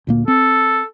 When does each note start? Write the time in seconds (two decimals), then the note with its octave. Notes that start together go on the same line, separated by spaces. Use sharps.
0.07 D2 A#2 A#3
0.28 C4 A4